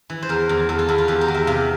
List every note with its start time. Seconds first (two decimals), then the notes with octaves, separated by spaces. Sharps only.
0.10 E3
0.22 C5
0.29 E2 A#4
0.49 E2
0.69 E2 A4
0.79 F4
0.89 E2 E4
0.98 F4
1.08 E2 G4
1.21 A#4
1.28 E2
1.34 E5
1.47 C3 F5